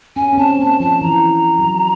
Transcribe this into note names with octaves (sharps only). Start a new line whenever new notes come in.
C#4 G#5
C#4
C4 A5
A#3 A5
F3 A5
E3 A#5
F#3